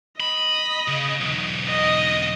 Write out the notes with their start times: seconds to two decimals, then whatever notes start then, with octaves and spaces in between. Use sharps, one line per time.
0.20 D#5 B5
0.88 C#3
1.20 B1 E2
1.68 D#5